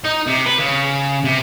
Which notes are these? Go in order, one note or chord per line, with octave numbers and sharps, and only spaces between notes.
D#4
C3
B4
C#3
C3